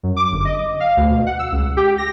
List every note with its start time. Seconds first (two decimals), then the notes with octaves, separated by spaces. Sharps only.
0.03 F#2
0.16 D6
0.32 G1
0.45 D#5
0.80 F5
0.97 D2
1.10 B2
1.27 F#5
1.39 E6
1.52 C#2
1.77 G4
1.98 A#6